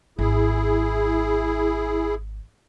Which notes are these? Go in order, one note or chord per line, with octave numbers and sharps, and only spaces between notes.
G#1 E4 G#4